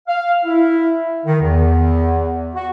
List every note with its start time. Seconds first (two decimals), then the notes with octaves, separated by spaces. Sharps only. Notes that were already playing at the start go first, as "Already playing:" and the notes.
0.08 F5
0.45 E4
1.25 D#3
1.41 E2
2.55 F#4